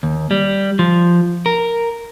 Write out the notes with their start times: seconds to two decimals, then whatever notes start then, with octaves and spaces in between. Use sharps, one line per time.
0.03 D#2
0.31 G3
0.79 F3
1.46 A#4